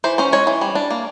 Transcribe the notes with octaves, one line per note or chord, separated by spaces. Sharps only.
E3 C5
C#4 C5
G#3 C#5
E3
G3
D4
A#3